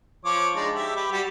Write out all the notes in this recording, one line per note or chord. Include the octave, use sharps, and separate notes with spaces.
F3 C#5 D6
G#3 D4 D#4
G4 E5
G4 B4
G3 F#4 G4